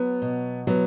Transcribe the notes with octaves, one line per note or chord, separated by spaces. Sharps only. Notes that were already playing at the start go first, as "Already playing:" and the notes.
Already playing: F#3 B3
B2
F#3 B3